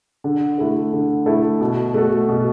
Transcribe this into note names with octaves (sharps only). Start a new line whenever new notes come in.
D3
A3 E4 A4
D3
A3 E4 A4
B2
A3 F#4 A4
B2